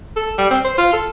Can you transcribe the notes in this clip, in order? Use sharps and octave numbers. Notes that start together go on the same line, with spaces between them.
A4
G3
C4
C5
F4
A4